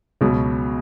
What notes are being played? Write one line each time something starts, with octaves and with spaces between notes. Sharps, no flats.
C#2 B2 F#3